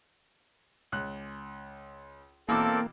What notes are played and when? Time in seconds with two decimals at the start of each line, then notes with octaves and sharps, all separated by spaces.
0.92 C#2 F#6
2.49 B2 E3 A#3 C4 A4 A#4 D5 D6